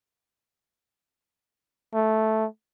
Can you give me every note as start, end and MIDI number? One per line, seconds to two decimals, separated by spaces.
1.94 2.46 57